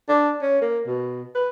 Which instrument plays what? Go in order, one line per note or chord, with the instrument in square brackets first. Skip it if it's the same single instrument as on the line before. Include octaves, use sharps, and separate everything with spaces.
[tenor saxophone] D4
C#4
A#3
B2
B4